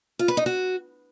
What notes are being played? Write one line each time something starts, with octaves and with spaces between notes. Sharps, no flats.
F4
B4
D#4
F#4